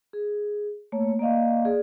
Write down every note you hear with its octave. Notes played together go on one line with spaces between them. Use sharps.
G#4
A3 A#3 C#5
A#3 D5 D#5 F5
G#4 D5